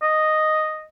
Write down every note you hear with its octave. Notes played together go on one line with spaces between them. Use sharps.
D#5